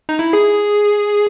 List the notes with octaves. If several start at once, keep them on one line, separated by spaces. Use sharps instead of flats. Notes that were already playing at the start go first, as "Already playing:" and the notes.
D#4
E4
G#4